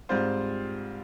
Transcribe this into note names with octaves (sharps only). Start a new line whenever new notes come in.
G#2 G3 C4 F4 C5